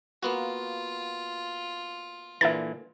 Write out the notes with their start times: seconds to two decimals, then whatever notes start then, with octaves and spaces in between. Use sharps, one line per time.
0.23 A#3 B3 F4 F#4
2.41 A#2 D3 E3 E5 A#5 A6